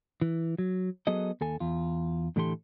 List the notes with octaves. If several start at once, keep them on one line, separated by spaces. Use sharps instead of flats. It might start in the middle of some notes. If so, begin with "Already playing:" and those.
E3
F#3
F#3 B3 G#4 A4 D#5
D#2 A4 G#5
E2 F4
A2 D3 E3 G4 A4 C6